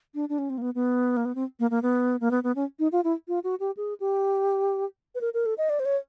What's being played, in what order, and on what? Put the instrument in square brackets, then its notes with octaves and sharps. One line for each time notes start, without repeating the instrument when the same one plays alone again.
[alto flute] D4
D4
C#4
C4
A#3
B3
B3
A#3
B3
C4
A#3
A#3
B3
A#3
B3
B3
C#4
D#4
F4
E4
F4
F#4
G4
G#4
G4
B4
A#4
A#4
A4
D#5
D5
C5
C#5